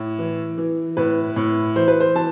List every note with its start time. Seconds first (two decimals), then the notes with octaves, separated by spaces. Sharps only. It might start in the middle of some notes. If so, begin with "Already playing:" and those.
Already playing: A2
0.19 E3
0.58 E3
0.97 A2 B4
1.36 A2
1.76 E3 C5
1.88 B4
2.00 C5
2.15 E3 A5